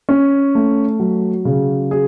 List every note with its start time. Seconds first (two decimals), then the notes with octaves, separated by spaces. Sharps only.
0.09 C#4
0.55 A3
1.00 F#3
1.45 C#3
1.91 G#4